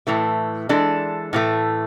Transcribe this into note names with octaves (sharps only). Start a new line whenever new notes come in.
A2 E3 A3
E3 G#3 D4 A4
A2 E3 A3